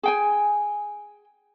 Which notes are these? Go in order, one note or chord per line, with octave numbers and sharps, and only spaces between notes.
G#4 G5 G#5